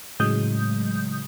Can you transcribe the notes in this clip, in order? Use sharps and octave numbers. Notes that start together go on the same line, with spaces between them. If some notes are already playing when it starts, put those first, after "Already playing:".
A2 C#3 F#3 G#3 D#6 G6